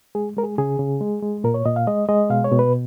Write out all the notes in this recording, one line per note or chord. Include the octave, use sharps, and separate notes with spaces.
G#3 G#4
G#3 A#4
G#4
C#3 G#4
C#3
G#3
G#3
A#2 A#4
C#5
A#2 D#5
F5
G#3 D#5
G#3 D#5
B2 F5
C#5
B2
B4